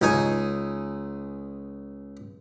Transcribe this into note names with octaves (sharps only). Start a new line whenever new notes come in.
C#2 D#4 G#5